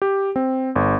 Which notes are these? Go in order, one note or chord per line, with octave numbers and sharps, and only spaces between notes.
G4
C4
G1